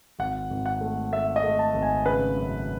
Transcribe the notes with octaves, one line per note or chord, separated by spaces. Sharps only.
G#1 F#5
G#1
F#5
A3
A3 E5
D#5
A3
A5
G#1
G#5
C#3 B4
F#2